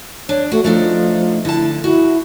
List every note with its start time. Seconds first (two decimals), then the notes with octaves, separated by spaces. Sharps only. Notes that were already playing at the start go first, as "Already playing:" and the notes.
0.29 D4 C#5
0.52 A3 F#4
0.64 F3 A3 D4 D#4
1.45 D3 E4 A5
1.84 E4 F#4